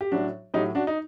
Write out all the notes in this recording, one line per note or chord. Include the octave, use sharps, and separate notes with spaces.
G4
A2 F#3 D4 F#4
A2 F#3 D#4 G4
D4 F#4
D#4